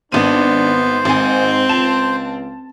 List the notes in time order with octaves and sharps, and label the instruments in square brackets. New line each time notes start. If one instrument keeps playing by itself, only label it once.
[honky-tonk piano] G#1 D#7 [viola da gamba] B3 [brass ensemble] D4 [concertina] C5
[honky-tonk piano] G#1 G#5 [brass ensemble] G#2 [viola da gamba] C4
[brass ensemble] C#2 F4 [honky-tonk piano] A5 E7